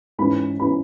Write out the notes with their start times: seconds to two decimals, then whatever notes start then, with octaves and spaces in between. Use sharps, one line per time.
0.18 G#2 E3 C#4 B5
0.60 E3 C#4 B5